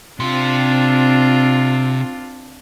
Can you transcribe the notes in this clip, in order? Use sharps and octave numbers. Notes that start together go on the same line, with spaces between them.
C3 C4 D4 F4 C6